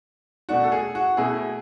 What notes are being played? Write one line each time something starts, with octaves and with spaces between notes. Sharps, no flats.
B2 A3 D4 F#4
A4
G#4
F#4
B2 A3 E4 G#4